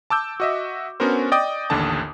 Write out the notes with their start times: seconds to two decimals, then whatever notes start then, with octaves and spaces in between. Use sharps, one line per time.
0.10 A5 D6 E6 G6
0.40 F#4 D#5 E5
1.00 B3 C#4 D4 F#4 A#4 C5
1.32 D5 D#5 G5 D6 D#6
1.70 A1 D#2 D3 D4 A4 A5